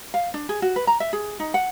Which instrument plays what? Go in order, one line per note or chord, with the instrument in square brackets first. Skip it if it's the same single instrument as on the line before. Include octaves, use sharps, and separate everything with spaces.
[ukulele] F5
D4
G#4
F#4
B4
A#5
E5
G#4
D#4
F#5